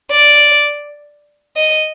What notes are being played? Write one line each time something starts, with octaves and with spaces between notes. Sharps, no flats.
D5
D#5